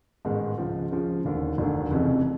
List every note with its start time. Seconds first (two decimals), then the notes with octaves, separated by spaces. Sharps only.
0.25 A1 G#2 D#3 G#3 B3
0.58 C#2 C#3 F3
0.91 C#2 C#3 F3
1.25 E1 D#2 D3
1.58 E1 D#2 D3
1.91 F1 F2 C#3 E3